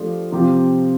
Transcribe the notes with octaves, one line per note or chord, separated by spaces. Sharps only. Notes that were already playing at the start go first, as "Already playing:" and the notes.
Already playing: F3 A3 D4 G4
C3 F3 C4 G4